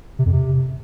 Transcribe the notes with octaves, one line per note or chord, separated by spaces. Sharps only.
C3
F2
C3